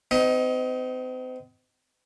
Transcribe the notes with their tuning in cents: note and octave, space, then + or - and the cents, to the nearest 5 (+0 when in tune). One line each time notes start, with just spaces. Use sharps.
C4 -40 D#4 +0 D#5 +30